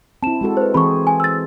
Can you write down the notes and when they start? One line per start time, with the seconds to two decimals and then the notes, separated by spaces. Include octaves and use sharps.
0.23 C4 E4 A5 E7
0.41 G#3 F#4 A4
0.57 B4 C5
0.74 E3 C4 G#4 B5 C#6
1.07 G#5
1.20 E6 A6